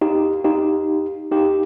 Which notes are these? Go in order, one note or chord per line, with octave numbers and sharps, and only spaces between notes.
D#4 G4
D#4 G4
D#4 G4